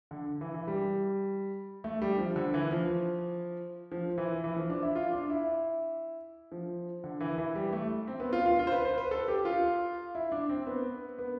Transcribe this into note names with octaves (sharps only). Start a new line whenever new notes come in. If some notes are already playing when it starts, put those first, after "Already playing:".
D3
E3
E3
G3
A3
G3
F3
D3
E3
F3
F3
E3
E3
F3
D4
E4
F4
D4
E4
F3
D3
E3
E3
G3
A3
C4
B3
F4
F4
F4
C5
B4
C5
B4
A4
G4
F4
E4
D4
C4
B3
B3